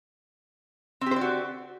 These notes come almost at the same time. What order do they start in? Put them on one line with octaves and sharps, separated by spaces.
C4 G4 C5 D5 F#4